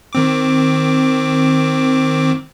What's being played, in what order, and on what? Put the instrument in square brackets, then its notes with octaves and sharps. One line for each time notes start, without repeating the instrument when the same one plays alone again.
[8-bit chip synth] D#3 C4 D6